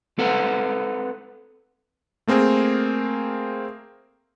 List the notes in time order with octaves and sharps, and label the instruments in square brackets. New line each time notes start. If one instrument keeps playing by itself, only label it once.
[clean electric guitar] C4 A4 B4 F#5
[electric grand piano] A3 A#3 C4 G#4 A#4